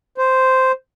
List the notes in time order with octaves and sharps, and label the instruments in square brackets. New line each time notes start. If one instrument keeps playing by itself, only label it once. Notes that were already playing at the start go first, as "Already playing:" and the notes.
[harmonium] C5